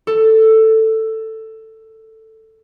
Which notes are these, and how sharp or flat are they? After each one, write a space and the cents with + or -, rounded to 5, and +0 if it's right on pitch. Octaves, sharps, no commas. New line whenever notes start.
A4 +10